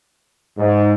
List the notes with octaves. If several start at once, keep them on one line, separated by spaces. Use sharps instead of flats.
G#2